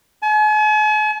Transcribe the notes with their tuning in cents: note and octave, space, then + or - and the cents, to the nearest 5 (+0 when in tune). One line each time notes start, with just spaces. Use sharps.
G#5 +45